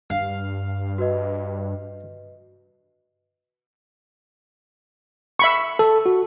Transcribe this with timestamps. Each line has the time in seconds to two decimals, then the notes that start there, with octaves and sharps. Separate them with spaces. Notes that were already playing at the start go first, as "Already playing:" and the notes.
0.10 G2 F5
0.98 F#4 B4 D#5
5.39 E5 B5 C#6
5.79 A4
6.06 F#4